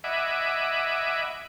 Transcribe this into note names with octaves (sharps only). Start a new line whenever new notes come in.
D#5 E5 F#5 G#5 B5 D6